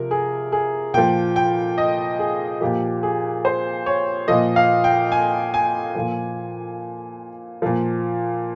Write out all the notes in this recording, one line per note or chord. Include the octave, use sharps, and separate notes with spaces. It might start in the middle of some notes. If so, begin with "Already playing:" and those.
Already playing: C3 F3 A#4
G#4
G#4
A#2 F3 G5
G5
D#5
G#4
A#2 F3 G4
G#4
C5
C#5
A#2 F3 D#5
F5
G5
G#5
G#5
A#2 F3
A#2 F3